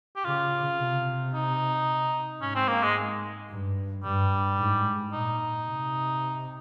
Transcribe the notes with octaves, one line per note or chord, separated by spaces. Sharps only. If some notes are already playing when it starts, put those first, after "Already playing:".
G4
C#3 F4
C3
D#4
G#2 C#4
C4
A#3
G#3
G2
G2 G3
G#2
A#2 D#4
C3